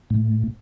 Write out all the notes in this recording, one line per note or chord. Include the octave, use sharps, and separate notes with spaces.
A2